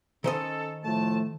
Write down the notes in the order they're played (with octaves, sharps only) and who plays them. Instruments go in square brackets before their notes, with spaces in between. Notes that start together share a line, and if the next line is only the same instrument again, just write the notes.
[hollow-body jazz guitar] D#3 C5 D#5 [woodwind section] C#4 A4
[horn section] A2 F3 A3 [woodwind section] A5